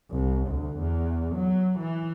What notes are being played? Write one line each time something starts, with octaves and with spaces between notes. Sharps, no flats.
C2
D2
E2
F#3
E3